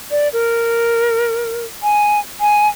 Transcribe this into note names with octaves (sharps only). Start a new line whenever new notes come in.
D5
A#4
G#5
G#5